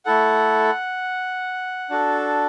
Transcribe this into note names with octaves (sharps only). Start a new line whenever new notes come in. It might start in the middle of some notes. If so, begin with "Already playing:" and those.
A3 E4 A4 F#5
D4 F#4 A4